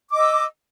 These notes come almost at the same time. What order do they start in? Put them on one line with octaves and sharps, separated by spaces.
D6 D#5 E6